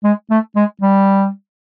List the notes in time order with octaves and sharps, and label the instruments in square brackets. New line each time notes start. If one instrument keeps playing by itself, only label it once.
[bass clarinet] G#3
A3
G#3
G3